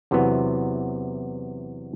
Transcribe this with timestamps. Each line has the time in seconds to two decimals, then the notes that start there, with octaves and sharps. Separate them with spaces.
0.11 E2 C3 E3 F#3 B3